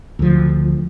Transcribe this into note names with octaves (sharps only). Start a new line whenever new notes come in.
D2 F3